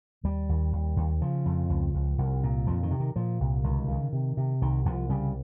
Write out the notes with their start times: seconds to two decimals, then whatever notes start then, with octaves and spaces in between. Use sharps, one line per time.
0.24 D#2 G3
0.49 D#2
0.73 D#2
0.96 D#2
1.21 C#3 F3
1.46 F2
1.69 C#2
1.94 C#2
2.18 C2
2.43 A#2
2.67 F2 F3
2.83 D#3
2.91 C3
3.00 D#3
3.16 A#2 F3
3.40 C2
3.64 C#2 D#3
3.88 C#3
4.13 C3
4.37 C3
4.62 C2 D#3
4.85 C2 F3
5.10 C#3 G3